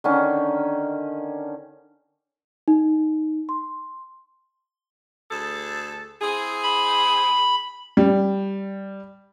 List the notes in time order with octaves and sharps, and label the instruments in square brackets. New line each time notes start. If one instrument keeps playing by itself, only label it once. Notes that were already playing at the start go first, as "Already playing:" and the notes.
[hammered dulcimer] D3 D#3 C#4
[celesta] D#4
C6
[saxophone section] D2 G#4 A4
C4 E4 G#4
[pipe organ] B5
[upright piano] G3